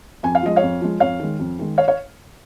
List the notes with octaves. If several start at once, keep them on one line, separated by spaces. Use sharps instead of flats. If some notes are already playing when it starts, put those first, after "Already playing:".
F2 G#5
F5
F3 G#3 D#5
C#5 F5
F2
F3 G#3
F2 C#5 F5
D#3 G#3
F2
D#3 G#3
C#5 F5
C#5 F5